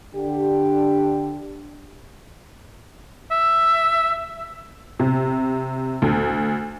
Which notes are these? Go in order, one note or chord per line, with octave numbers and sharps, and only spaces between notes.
D3 D4 G4
E5
C3
D2